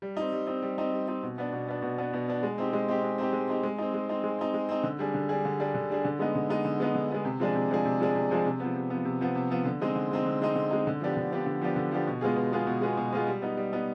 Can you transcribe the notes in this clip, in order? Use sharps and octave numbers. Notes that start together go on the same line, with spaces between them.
G3
C4 D#4
G3
C4 D#4
G3
C4 D#4
G3
C4 D#4
B2
B3 D4
B2
B3 D4
B2
B3 D4
B2
B3 D4
G#3
C4 D#4 G4
G#3
C4 D#4 G4
G#3
C4 D#4 G4
G#3
C4 D#4 G4
G#3
C4 D#4
G#3
C4 D#4
G#3
C4 D#4
G#3
C4 D#4
D3
G3 D4 G#4
D3
G3 D4 G#4
D3
G3 D4 G#4
D3
G3 D4 G#4
D3
G#3 B3 D#4
D3
G#3 B3 D#4
D3
G#3 B3 D#4
D3
G#3 B3 D#4
C3
F3 G#3 D4 G#4
C3
F3 G#3 D4 G#4
C3
F3 G#3 D4 G#4
C3
F3 G#3 D4 G#4
C3
F3 B3
C3
F3 B3
C3
F3 B3
C3
F3 B3
D3
G#3 C4 D#4
D3
G#3 C4 D#4
D3
G#3 C4 D#4
D3
G#3 C4 D#4
D3
F3 B3 D4 G4
D3
F3 B3 D4 G4
D3
F3 B3 D4 G4
D3
F3 B3 D4 G4
B2
G#3 B3 F4 G#4
B2
G#3 B3 F4 G#4
B2
G#3 B3 F4 G#4
B2
G#3 B3 F4 G#4
G3
B3 D#4
G3
B3 D#4